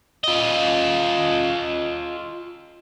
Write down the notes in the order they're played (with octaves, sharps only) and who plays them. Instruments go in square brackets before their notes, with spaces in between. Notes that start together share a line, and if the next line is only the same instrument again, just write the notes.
[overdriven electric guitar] F4 D#5